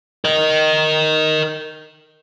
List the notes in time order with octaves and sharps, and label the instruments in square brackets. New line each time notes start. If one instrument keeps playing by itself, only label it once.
[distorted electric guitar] A#4 D#5